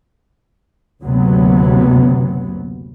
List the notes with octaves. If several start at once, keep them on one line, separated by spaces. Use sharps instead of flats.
F#1 D2 C3 F#3 B3